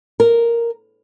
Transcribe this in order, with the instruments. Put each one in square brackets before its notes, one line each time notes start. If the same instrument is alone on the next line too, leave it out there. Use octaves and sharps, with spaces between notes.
[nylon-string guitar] A#4